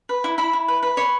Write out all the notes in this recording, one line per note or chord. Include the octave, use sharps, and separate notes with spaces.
B4
E4
E4 B5
E4
B4
B4
C#5 B5